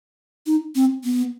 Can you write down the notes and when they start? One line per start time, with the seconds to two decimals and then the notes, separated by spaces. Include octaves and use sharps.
0.47 D#4
0.75 C4
1.04 B3